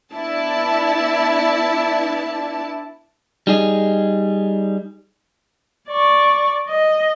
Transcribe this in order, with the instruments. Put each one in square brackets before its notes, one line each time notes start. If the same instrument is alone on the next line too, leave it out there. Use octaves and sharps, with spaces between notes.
[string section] B3 D4 E4 D5 A5
[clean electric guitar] G3 D#4 G#4 D#5
[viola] D5 C#6
D#5